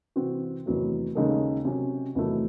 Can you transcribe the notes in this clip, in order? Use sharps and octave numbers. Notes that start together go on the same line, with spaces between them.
C3 E3 C4 F#4
E2 C3 D#3 F#3 A3
D#2 C#3 G#3 D#4 A4
C3 F#3 C#4 F#4
E2 C3 D#3 F#3 A3